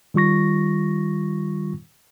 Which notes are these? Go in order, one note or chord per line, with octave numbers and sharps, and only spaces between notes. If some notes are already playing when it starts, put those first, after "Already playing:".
D#3 G3 F4 C#6 A#6